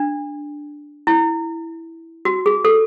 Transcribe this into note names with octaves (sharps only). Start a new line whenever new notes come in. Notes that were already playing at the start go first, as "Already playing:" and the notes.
Already playing: D4
E4
F#4
G#4
A4